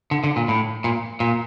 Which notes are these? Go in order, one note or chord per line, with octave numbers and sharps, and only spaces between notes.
D3
D3
A#2
A2
A#2
A#2